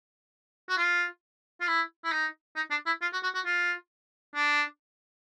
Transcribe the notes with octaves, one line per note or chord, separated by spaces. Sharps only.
F#4
F4
F4
E4
E4
D#4
D#4
D4
E4
F4
F#4
F#4
F#4
F4
D4